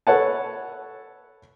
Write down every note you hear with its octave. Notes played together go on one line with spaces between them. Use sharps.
A4 B4 C#5 F#5 A5